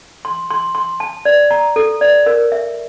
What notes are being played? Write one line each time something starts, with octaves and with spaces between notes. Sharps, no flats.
C6
C6
C6
A5
D5
A#5
A4
D5
A#4
E5